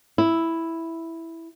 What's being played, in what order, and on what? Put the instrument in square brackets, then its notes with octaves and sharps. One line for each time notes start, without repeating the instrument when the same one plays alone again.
[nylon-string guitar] E4